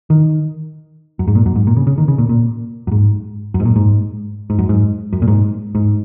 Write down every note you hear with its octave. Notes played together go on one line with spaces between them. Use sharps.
D#3
F#2
G#2
A#2
F#2
G#2
A#2
C#3
C#3
D#3
C#3
A#2
A#2
F#2
G#2
F#2
G#2
A#2
G#2
G#2
F#2
G#2
F#2
A#2
G#2
G#2